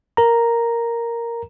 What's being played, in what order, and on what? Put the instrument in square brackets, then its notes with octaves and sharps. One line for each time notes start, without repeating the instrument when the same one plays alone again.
[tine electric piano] A#4 A#5